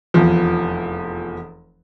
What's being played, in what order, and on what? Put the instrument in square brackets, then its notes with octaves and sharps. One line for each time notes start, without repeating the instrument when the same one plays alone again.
[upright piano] F1 E2 F3